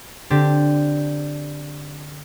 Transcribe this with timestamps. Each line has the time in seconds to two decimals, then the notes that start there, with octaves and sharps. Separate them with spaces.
0.30 D3 C4 D4 G4 A6